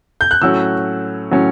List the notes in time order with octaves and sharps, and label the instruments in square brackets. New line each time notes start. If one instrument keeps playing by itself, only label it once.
[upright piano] G6
F#6
A2 F#3 C#4 E6
A2 F#3 C#4